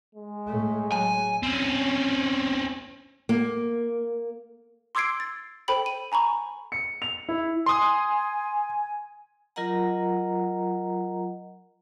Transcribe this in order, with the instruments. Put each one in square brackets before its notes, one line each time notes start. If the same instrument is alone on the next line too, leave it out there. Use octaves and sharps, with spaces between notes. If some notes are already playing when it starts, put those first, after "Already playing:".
[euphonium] G#3
[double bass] A2 A3
[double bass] F#3 [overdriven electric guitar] G#5
[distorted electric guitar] C4 C#4
[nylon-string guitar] A#3
[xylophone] C6 D6 E6 G#6 C7 D7
A6
A4 C5 G5 B5 F#7
D#7
G#5 A#5 B5 C#6
[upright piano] C#7
F7
E4
[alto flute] G#5 [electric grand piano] C6 D#6
[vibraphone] F#3 F4 A#4 D#5 F#5 A#5